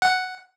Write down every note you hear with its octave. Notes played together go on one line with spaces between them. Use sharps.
F#5